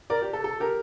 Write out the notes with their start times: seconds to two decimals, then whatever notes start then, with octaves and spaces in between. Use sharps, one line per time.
0.10 A#4 D5
0.22 G4
0.33 A4
0.44 A4
0.60 G4 A#4